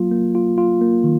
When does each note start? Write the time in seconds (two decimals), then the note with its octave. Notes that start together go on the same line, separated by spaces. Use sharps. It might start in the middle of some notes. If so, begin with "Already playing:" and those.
Already playing: F#3 A#3 F4
0.12 A#3
0.35 F4
0.58 F4
0.81 A#3
1.04 D#3